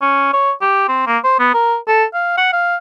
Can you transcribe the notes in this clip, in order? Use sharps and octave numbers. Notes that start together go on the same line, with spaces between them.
C#4
C#5
G4
C4
A#3
C5
B3
A#4
A4
F5
F#5
F5